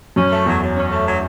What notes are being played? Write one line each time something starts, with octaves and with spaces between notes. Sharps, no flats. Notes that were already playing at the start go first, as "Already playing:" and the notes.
F#2 C#4
A3
E2 F#3
F#3
C#4
A3
F#3